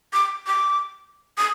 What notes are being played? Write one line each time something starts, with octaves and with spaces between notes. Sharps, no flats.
D6
D6
D#6